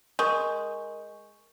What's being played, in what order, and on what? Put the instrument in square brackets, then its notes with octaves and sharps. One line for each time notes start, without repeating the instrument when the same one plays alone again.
[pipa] G#3 [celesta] A#4 C#6 G6